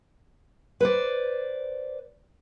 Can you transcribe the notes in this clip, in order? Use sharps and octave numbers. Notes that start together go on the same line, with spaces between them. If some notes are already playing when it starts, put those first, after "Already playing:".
B4 C5 D5